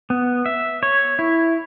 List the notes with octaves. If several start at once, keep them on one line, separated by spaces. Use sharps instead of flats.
B3
E5
C#5
E4